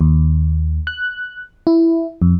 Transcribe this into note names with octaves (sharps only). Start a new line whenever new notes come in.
D#2
F#6
E4
F2